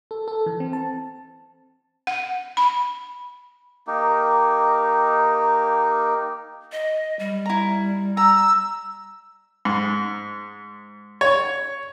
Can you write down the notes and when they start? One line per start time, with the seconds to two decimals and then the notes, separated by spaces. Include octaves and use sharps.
0.11 A4
0.28 A4
0.46 E3
0.60 C4
0.73 A5
2.07 F#5
2.57 B5
3.87 A#3 D#4 G4
6.72 D#5
7.19 G3
7.46 E4 A#5
8.17 A#5 E6
9.65 G#2
11.21 C#5